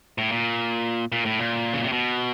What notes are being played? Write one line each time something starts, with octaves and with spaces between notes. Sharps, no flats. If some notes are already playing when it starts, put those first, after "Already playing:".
A2
A#2
A#2
A2
A#2
C#3
C3
B2